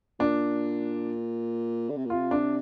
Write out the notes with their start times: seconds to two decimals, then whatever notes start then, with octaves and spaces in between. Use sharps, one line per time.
0.20 A#2 D4
1.89 D3
1.97 C3
2.05 A#2
2.10 C3 F4
2.31 D4